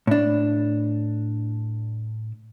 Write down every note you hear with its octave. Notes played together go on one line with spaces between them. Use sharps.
A2 D4